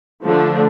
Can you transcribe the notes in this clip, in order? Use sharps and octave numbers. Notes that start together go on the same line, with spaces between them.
D3 F3 A3 D4